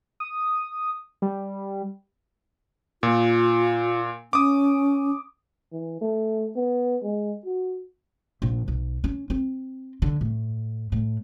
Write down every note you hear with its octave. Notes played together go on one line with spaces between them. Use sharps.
D#6
G3
A#2 F4
C#4 D6 D#6
E3
A3
B3
G#3
F#4
A#1
B1
C#4
C4
D3
A2
A2